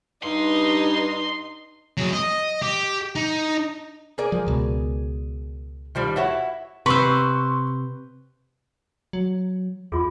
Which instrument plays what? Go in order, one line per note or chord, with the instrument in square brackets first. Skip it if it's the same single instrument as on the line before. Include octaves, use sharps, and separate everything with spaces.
[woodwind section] G2 [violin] D#4 [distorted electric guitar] C6
[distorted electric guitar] F#3 G#4
D#5
G4
D#4
[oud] G#4 A#4 D5
[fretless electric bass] F3
C#2 B2
[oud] D#3 F3 G3
E4 F#4 C#5
[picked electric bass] C3 [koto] B4 C5 [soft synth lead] C6 [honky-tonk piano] C#6 E6
[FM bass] F#3
[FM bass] E2 [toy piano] F4 G#4